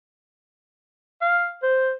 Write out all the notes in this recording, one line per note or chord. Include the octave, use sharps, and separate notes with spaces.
F5
C5